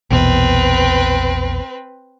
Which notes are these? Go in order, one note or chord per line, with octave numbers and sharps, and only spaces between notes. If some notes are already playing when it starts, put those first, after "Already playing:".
A#1 E2 B2 C4 B4